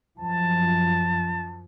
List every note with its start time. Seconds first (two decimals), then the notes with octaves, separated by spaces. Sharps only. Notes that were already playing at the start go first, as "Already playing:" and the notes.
0.19 F#2 F3 A5